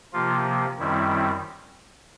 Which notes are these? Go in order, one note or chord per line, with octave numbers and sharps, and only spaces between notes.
C3 F3 A#3 F4
F#2 D#3 G3 C4 E4